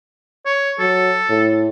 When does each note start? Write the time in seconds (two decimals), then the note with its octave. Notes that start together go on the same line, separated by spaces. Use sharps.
0.46 C#5
0.79 F#3 A4
1.29 A2